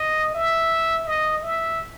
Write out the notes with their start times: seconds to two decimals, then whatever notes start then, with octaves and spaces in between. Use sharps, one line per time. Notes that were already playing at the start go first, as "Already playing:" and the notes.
Already playing: D#5
0.34 E5
1.07 D#5
1.43 E5